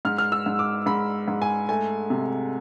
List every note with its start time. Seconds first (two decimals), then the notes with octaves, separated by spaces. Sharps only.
0.05 G#2 F6
0.18 F6
0.32 E6
0.46 G#2
0.59 D6
0.86 G#2 B5
1.28 G#2
1.42 G#5
1.69 A3 G#5
2.10 C3